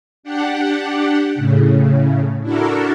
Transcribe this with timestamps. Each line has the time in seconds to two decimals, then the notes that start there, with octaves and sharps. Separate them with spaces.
0.23 D4 G4 F#5
1.35 A2 C#3
2.42 D4 E4 F#4 A4 A#4